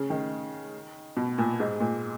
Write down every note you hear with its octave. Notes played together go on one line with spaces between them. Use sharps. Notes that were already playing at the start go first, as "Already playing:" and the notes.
Already playing: C#3
D#3
B2
A#2
G#2
A#2